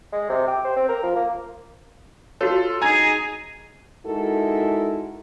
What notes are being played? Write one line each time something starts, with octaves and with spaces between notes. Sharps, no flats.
G#3
C3
G4
C5
C4
A#4
F3
A#3
F4 F#4 A4 C#5
D#4 G#4 G#5 A#5 G#6
G#3 D#4 E4 F#4 A4 A#4